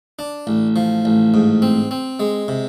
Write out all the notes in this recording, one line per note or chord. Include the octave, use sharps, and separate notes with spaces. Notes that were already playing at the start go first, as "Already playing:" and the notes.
D4
A1
F3
A1
G#2
C4
C4
G#3
C3